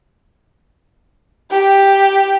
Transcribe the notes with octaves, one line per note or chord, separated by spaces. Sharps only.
G4